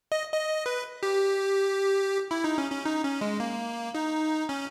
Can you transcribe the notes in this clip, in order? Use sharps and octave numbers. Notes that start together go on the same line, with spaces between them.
D#5
D#5
B4
G4
E4
D#4
C#4
C#4
D#4
C#4
G#3
A#3
D#4
C#4